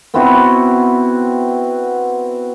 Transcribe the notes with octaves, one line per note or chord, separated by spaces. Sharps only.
B3 C4 E4 F#4